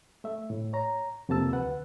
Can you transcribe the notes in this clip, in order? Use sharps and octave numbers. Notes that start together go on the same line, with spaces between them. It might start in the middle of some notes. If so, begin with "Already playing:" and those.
A3 E5
A2
C#5 A#5
F2 C3 A#3 A5 E6
D2 B4 F#5